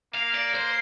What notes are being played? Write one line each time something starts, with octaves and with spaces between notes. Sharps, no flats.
A#3 F5
D5
C5